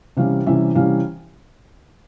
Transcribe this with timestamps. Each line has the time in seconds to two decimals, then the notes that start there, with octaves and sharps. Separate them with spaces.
0.17 C3 E3 G3 C#4 F5
0.46 C3 E3 G3 C#4 E5
0.75 C3 E3 G3 C#4 F5